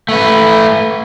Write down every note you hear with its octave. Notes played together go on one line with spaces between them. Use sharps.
A3 B4